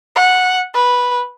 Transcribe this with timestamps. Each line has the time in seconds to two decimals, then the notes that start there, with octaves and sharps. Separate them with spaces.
0.16 F#5
0.74 B4